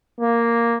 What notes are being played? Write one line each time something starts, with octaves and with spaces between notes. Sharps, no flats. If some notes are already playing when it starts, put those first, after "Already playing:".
A#3